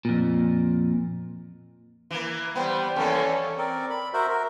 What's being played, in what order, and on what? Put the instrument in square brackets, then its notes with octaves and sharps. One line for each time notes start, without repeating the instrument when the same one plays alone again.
[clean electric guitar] F2 A#2
[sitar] E3 A#3
[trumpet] G3 [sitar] B3 [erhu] C5 [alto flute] G5
[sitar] E2 A#3 [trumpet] C#4 [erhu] A4
[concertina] C4 A#4 D5
B5
F#4 A#4 C5 E5
A#4